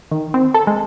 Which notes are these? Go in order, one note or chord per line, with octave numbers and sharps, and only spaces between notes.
D#3
C4
A4
G#3